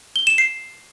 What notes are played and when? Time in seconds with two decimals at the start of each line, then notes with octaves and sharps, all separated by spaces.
0.16 G7
0.27 E7
0.38 C7